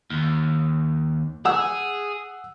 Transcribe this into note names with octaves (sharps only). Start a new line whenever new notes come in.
D#2
G#4 F#5 E6